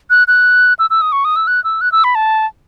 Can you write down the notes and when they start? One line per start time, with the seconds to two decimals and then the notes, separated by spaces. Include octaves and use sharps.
0.10 F#6
0.28 F#6
0.79 E6
0.90 E6
1.02 D#6
1.12 C#6
1.25 D#6
1.36 E6
1.47 F#6
1.64 E6
1.81 F#6
1.92 E6
2.04 B5
2.15 A5